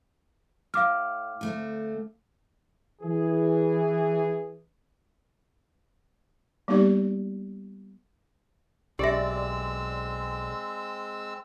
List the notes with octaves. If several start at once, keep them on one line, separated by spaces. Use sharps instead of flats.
A2 F5 D6 F6
D2 A3 C4
E3 G#4
G3 A#3 B3 D#4 G4 D5
B1 G#3 C4 G4 D5 E5 E6